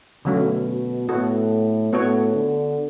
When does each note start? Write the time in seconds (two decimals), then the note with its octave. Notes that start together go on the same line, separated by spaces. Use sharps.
0.25 B2 D3 F#3 A3 C#4
1.09 A2 B3 F#4 A4
1.93 A2 B3 F#4 A4 C#5
2.34 D3